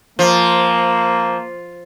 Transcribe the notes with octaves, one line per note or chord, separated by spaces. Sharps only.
F3 A#3